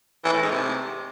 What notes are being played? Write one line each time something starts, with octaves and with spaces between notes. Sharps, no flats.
E3
A2
G#2
C3